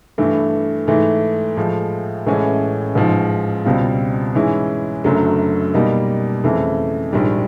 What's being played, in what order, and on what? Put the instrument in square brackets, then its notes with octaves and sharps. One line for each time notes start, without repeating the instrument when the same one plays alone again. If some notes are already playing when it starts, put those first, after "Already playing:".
[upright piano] G2 E3 A3
G#2 E3 A3
A2 F3 G#3
A1 A2 E3 G#3 C#4
A1 G#2 F3 G#3
C#2 B2 G3 C4 F4
G#2 E3 G#3 C#4 E4
F#1 F#2 D3 F#3 A3
B2 G3 A#3 D#4
F2 C#3 E3 A3
A#1 G#2 D#3 G3